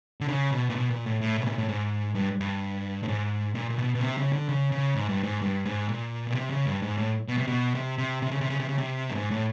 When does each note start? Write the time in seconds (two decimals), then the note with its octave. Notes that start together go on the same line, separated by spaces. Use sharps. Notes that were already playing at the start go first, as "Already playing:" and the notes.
0.21 D3
0.28 C#3
0.52 B2
0.70 A#2
0.75 B2
0.91 A#2
1.06 A2
1.21 A2
1.37 B2
1.47 A#2
1.58 A2
1.68 G#2
2.15 G2
2.40 G2
3.03 A2
3.08 G#2
3.55 A#2
3.70 A#2
3.78 B2
3.95 B2
4.01 C3
4.18 C#3
4.33 D3
4.49 C#3
4.72 C#3
4.95 G#2
5.09 G2
5.23 G#2
5.42 G2
5.65 G#2
5.89 A#2
6.27 B2
6.35 C3
6.50 C#3
6.66 G2
6.82 G#2
6.97 A2
7.28 B2
7.38 C3
7.47 B2
7.75 C3
7.98 C3
8.22 C3
8.31 C#3
8.41 C3
8.50 C#3
8.60 C3
8.69 C#3
8.78 C3
9.10 G2
9.15 G#2
9.31 A2